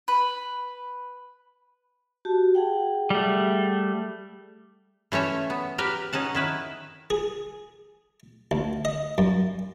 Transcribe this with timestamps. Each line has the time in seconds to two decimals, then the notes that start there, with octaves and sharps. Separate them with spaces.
0.08 B4
2.25 F#4 G4 A5
2.55 G#4 F#5 G5
3.10 G3 A3
5.12 E3 A3 C#4 C#5 E5
5.50 B3
5.78 G4 A#4 B4
6.13 C#4 D#4 F#5 A5
6.35 D#3 E4 B4
7.10 G#4
8.51 D2
8.85 D#5
9.18 F#2